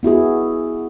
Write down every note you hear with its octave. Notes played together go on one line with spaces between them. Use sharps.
B3 E4 F#4 G#4